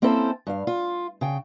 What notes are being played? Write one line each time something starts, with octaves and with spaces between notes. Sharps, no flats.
A#3 C4 C#4 E4 A4 C5
G2 F5
F4
C#3 G5